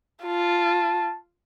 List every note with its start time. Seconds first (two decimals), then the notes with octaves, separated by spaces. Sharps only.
0.24 F4 A5